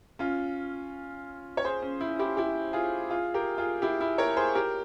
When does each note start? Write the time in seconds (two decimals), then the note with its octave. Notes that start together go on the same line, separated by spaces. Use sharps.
0.19 C#4 F4
1.57 C#5
1.64 G#4 C5
1.82 C#4
2.00 E4
2.19 E4 G4
2.37 E4 G4
2.73 F4 G#4
3.10 F4 G#4
3.34 G4 A#4
3.58 F4 G#4
3.82 E4 G4
4.01 E4
4.18 A#4 C#5
4.36 G#4 C5
4.55 G4 A#4